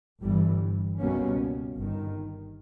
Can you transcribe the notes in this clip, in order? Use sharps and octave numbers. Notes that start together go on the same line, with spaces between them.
G1 G2 E3 G3
C#2 B2 G3 A#3 C#4
G1 G2 D#3